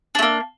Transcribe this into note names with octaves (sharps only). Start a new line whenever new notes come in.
A3 A#3 D4